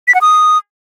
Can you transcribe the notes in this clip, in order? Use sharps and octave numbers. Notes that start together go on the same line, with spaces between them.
B6
F#5
D#6